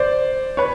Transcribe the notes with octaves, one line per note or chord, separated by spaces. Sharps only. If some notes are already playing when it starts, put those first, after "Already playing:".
Already playing: C5 D5
B4 C#5